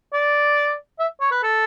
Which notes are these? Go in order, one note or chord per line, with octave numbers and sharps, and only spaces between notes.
D5
E5
C#5
B4
A4